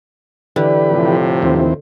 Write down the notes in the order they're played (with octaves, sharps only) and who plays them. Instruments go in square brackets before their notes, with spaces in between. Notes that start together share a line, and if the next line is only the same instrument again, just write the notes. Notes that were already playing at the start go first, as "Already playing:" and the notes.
[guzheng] D3 [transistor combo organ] E3 G4 B4
[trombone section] A2 C3 F3
[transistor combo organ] D#2 E3 C4